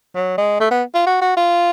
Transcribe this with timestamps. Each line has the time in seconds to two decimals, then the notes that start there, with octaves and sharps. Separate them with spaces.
0.15 F#3
0.38 G#3
0.60 A3
0.71 B3
0.94 F4
1.07 F#4
1.21 F#4
1.37 F4